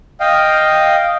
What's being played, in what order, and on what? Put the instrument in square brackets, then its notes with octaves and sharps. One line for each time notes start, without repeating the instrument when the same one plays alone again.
[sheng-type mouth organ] D#5 F5 G5